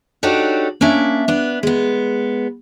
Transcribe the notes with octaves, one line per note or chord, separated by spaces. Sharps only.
D4 D#4 F#4 G4 A4 C#5
A#3 C#4 D4 E5
B3 D4
G#3 B3